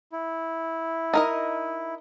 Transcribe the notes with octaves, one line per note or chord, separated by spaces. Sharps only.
E4
D#4 A#4 D#5